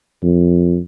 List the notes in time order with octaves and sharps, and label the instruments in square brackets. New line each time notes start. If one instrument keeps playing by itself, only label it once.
[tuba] F2